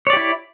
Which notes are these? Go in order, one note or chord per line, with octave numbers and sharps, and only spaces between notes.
E4 G4 C#5 D5